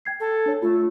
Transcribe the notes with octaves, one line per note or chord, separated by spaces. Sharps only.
G5 G#6 C7
A4
D4 C#5
A3 F4